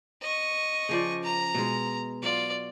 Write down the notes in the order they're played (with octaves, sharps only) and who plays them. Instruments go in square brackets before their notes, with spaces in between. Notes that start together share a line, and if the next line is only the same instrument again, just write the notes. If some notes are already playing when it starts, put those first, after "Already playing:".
[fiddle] D#5 C#6
[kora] C#3 F3 D5
[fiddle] A#5
[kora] B2 G#3
[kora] F#3 [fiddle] F4 D5